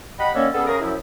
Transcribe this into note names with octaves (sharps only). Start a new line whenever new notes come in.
G4 D#5 F#5 B5
D3 D#3 A#3 C#4 A4 C#5
G3 B3 C#4 G#4 A4
C#3 G#4 A#4
F#2 F3 E4